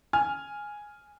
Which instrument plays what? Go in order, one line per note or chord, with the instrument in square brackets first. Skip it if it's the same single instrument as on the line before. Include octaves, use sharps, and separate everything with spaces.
[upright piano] G#5 F6